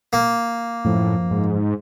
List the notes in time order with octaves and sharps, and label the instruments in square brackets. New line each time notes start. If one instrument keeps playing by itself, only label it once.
[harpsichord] A#3
[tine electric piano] F#2 F3 [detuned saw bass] A2
[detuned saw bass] G#2